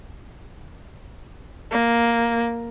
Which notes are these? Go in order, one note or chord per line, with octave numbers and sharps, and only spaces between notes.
A#3